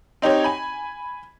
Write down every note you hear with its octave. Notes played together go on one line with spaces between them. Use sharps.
C4 D#4 G4 C#5
G#5 B5